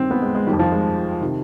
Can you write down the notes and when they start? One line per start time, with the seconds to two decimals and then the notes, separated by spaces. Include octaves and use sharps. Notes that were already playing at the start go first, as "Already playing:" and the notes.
Already playing: G2 D#3 C4
0.11 B3
0.22 G#3
0.35 G#3
0.47 D#3 G3
0.52 F2
0.59 F3
0.72 G#3
1.21 C3 D#3